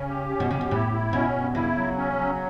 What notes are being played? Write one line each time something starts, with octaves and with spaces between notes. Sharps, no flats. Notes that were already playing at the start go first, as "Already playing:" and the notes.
Already playing: C#3 C#4
G4
C#4
B2
C#3 G4
B2
A2 E4
E4
B2 C#4
G2
C#3 E4
F#3
C#4
F#3